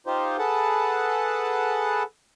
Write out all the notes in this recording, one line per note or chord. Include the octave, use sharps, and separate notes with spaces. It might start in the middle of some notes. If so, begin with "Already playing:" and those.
D#4 F4 G4 C5
G#4 A4 B4 F#5 A5